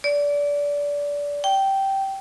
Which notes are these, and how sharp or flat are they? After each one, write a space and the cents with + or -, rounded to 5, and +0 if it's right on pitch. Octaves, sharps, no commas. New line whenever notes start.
D5 -25
G5 -10